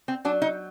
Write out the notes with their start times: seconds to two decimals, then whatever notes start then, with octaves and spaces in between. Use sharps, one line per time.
0.08 C4
0.25 F#3 D4
0.42 D#4